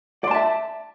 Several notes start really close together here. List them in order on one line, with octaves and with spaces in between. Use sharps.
D5 C6 A5 E5